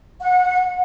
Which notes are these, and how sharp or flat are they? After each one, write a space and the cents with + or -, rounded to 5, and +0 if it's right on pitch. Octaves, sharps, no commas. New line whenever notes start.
F#5 -25